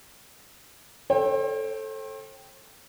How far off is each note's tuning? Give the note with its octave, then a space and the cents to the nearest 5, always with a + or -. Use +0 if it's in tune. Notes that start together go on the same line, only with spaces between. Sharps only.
A4 +0 C5 +45 G5 +0